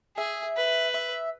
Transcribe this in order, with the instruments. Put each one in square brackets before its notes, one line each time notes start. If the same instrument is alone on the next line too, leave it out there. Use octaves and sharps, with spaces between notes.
[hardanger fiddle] G#4 [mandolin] E5
[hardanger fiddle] B4
[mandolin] E5